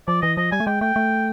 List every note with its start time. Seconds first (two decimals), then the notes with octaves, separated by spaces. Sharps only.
0.07 F3 D5
0.22 E3 D#5
0.37 F3 D#5
0.52 G3 G#5
0.60 A3
0.66 G#3 G5
0.81 A3 G5
0.96 A3